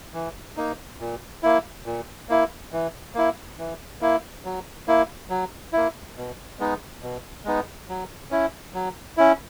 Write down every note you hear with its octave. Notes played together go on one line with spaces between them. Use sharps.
E3
A#3 D#4
A#2
A#3 E4
A#2
A#3 E4
E3
A#3 E4
E3
A#3 E4
F#3
A#3 E4
F#3
A#3 E4
B2
G#3 B3 D#4
B2
G#3 B3 D#4
F#3
C#4 E4
F#3
C#4 E4